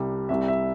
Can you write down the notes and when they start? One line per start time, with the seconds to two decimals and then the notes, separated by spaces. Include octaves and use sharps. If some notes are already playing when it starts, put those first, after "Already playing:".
Already playing: C2 C3 G3
0.29 C2 C3 G3 E5
0.48 E5